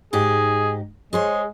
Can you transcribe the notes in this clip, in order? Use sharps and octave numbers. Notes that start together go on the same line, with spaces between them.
G#2 D#4 G4 G#4
G#3 G#4 C5 C#5